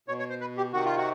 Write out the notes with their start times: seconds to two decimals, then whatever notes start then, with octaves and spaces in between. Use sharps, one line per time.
0.08 B2 C#5
0.19 C#5
0.30 C5
0.41 B4
0.57 G4
0.73 C3 D#3 F#4
0.85 F4
0.97 F#4